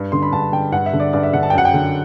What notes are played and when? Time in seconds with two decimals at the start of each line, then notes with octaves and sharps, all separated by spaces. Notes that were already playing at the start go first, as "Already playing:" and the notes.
Already playing: G2
0.12 D3 C6
0.22 B5
0.32 G2 A5
0.52 D3 G5
0.72 G2 F#5
0.86 E5
0.93 D3
1.00 D5
1.13 G2 D5
1.23 E5
1.33 D3 F#5
1.43 A5
1.50 G5
1.53 F#2 F#5
1.65 G5
1.74 D3